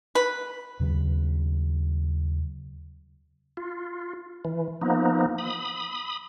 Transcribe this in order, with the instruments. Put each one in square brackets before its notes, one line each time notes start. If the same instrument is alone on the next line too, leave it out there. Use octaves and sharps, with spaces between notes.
[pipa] B4
[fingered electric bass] D#2 C#3 F#3
[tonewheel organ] F4
E3
F3 A#3 B3 D#4
B5 D#6